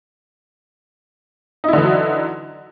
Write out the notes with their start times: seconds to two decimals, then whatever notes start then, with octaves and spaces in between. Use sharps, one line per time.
1.64 D#4
1.68 E4
1.73 D3
1.78 E3
1.82 F#3